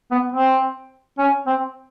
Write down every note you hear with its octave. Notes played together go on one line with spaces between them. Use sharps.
B3
C4
C#4
C4